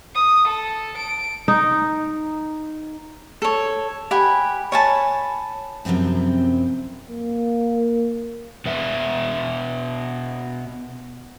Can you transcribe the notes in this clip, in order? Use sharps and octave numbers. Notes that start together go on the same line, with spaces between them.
D#6
A4
D7
D#4
A4 C#5
G4 F#5 G#5 B5
C#5 G#5 A5 B5
F#2 C3 F3 C4 E4
A#3
B2 B4 E5